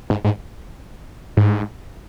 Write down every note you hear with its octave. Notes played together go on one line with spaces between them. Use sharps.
G#2
G#2
G#2